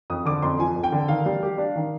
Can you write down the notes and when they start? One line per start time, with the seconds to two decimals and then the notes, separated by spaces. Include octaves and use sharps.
0.10 F2 D#6
0.25 D3 D6
0.42 F2 C6
0.59 F3 G#5
0.76 F2
0.84 G5
0.92 D3
1.08 D#3 F5
1.26 G3
1.43 G4
1.58 D4
1.76 D#3